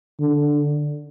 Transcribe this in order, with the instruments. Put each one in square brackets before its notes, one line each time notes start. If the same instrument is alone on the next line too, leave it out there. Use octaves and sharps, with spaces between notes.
[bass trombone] D3